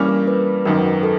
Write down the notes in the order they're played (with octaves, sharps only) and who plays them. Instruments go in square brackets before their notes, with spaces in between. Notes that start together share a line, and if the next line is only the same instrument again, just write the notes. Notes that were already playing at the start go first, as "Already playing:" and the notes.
Already playing: [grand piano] G2 E3 G3 A#3 C#4
[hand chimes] A#4
B4
[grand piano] G#1 F#2 D#3 [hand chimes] A#4
[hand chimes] B4
A#4
A4